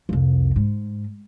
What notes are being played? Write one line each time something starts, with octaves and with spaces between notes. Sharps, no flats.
C2 F2
G#2